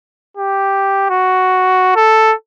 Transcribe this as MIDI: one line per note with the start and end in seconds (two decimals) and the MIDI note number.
0.37 1.09 67
1.10 1.95 66
1.96 2.34 69